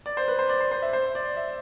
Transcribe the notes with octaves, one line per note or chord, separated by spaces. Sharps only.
D5
C5
B4
C5
D5
C5
C5
E5
C5
D5
E5